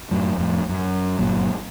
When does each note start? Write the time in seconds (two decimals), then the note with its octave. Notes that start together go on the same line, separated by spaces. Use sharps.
0.11 F#2 A2 F#3
0.38 F2 A2
0.69 F#2
1.19 G1 C#2 A#2 F#3